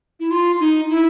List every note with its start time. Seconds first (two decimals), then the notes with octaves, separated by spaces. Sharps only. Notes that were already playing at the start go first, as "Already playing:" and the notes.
0.20 E4
0.31 F4
0.60 D#4
0.90 E4